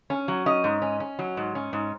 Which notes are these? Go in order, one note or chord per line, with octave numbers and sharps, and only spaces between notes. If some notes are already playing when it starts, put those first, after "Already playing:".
C#4
F#3
C#4 D#5
G#2
C#4
C#4
F#3
G#2
C#4
G#2